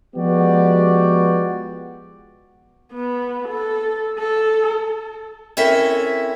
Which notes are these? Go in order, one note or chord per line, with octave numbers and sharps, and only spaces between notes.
F3 G#3 B3 F#4 G4 D5
B3
A4
A4
C4 C#4 E4 A4 A#4 E5